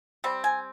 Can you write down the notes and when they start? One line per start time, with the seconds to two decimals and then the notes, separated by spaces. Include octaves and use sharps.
0.24 G3 C4
0.44 G#5